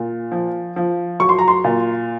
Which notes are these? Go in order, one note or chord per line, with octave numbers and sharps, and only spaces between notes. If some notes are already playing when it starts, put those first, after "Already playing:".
Already playing: A#2
F3
F3
F#3 C#6
C6
A#5
C6
A#2